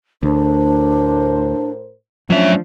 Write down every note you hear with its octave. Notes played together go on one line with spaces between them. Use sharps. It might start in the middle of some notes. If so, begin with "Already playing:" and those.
D2 A2 D4 A#4 C5
F3 F#3 A3 C#4 D4 E5